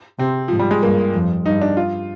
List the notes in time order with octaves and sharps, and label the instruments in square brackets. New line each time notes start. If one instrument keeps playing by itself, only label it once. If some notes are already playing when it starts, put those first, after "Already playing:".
[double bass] C3 [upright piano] C4
[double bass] G#2 [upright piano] F3
[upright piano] G3
G#3
[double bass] G2 [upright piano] A#3
[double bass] F2
[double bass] G2 [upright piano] D#4
[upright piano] D4
F4